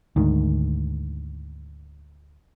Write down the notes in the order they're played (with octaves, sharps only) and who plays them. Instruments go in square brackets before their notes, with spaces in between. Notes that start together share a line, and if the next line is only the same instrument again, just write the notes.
[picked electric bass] D2 G#2 D#3